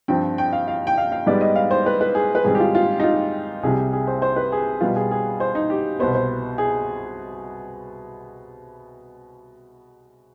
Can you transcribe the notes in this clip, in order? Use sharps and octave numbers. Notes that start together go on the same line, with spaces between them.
G2 F3 C4 G5
G5
F5
F5
G5
F5
F5
G#2 G3 B3 D5
D#5
F5
C5
B4
B4
G#4
B4
G#2 D#3 G3 C4 G#4
G4
F4
F4
D#4
F4
C2 C3 G3 G#4
G#4
C5
C5
B4
G#4
B2 G3 B3 F4
G#4
G#4
C5
D#4
G4
C2 B2 B3 C5
C5
G#4